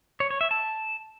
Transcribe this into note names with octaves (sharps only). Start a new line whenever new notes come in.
C#5
C#5
E5
A5